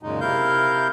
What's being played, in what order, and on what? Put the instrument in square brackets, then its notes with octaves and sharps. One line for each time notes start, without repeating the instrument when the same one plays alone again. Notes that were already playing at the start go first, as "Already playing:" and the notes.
[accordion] F#2 A#2 C#3 G#3 D#4
C3 E4 A#4 F5 G6